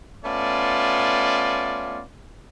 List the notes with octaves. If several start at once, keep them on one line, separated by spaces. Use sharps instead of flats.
A3 B3 C#4 F4 D5